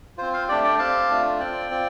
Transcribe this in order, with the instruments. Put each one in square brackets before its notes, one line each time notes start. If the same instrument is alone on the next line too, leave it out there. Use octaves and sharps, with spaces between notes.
[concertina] C4 F4 C5
C5 F5
A3 D4 G4 D5 G5
D5 G5
C4 G4 F5 A5
A3 D4 F4
C4 F4 D5 G5
C4 F4